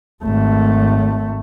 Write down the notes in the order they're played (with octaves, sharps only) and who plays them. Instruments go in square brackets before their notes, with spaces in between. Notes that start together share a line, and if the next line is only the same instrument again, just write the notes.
[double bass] G#1 A3